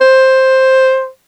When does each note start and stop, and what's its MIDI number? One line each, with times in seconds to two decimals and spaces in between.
0.01 1.08 72